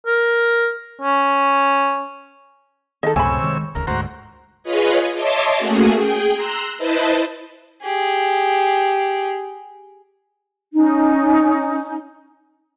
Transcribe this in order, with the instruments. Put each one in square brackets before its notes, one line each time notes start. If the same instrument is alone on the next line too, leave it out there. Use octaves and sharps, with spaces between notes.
[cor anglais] A#4
C#4
[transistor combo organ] D#3 [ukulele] A4 D#5
[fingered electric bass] C#2 F#2 A2 [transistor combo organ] C3 C#5 E6 [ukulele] G#5 B5
[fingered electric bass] D#3 F#3 G#3
[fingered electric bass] D#1 C#2 [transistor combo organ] A#4
[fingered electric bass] D2 G#2 [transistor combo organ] F#4 C5 A#5
[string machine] F4 G#4 B4 C#5 D#5
C#5 D#5 E5 A5 C6 D6
A3 A#3 C#4 F#4 G#4
G#4 G5
A#5 C6 E6 F#6
E4 B4 C5 D#5 A5
[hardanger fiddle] G4 G#4
[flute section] C#4 D#4